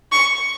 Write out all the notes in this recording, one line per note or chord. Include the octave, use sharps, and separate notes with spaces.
C#6